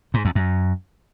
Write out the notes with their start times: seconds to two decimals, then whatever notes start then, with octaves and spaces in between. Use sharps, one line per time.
0.14 G#2
0.25 E2
0.35 F#2